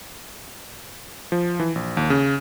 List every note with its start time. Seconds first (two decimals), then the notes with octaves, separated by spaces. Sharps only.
1.32 F3
1.59 E3
1.75 A#1
1.97 D#2
2.10 C#3